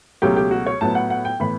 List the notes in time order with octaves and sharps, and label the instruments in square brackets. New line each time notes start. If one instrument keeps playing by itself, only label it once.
[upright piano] C#2 B2 F#3 A3 G4
G4
F#4
C#5
A2 F#3 B3 A5
F#5
F#5
G5
A2 E3 B3 B5